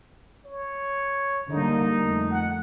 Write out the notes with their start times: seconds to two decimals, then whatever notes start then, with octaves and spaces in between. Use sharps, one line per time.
0.46 C#5
1.50 D3 G3 A#3 D#4
1.98 F2 A3
2.31 F#5